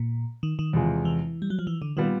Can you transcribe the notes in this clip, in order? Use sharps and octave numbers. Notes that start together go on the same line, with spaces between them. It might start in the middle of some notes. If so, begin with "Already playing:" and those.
Already playing: A#2
D#3
D#3
E2 C3 F3 G#3
E3
G3
F#3
F3
E3
D3
A#2 D#3 G3 B3